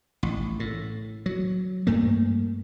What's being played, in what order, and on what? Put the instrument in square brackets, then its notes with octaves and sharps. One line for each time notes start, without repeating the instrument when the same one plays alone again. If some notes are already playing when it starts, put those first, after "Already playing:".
[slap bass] A1
A2
F#3
G2 A3 A#3